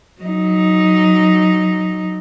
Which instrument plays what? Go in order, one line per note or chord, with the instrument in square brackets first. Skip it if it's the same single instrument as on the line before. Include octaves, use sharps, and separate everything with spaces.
[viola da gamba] F#3 D#4